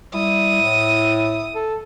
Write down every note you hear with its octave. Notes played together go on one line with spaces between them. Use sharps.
G3 E4 D#6
A2
A4